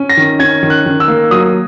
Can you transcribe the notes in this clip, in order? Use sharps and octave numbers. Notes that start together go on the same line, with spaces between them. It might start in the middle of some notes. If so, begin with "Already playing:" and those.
Already playing: C#4
A#6
D#3
C#4 G#6
D#3
F#6
D#3
E6
A#3
F#3 D#6